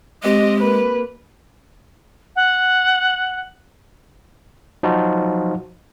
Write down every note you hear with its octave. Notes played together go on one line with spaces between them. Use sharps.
G#3 C4 G4 D#5
A#3 B4
F#5
F3 F#3 D#4 F4 F#4